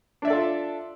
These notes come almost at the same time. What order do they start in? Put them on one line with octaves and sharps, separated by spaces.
D4 E5 D5 A4 F4